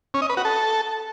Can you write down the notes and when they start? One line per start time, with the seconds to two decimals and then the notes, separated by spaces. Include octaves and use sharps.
0.14 C#4
0.22 D#5
0.29 B4
0.37 F#4
0.45 A4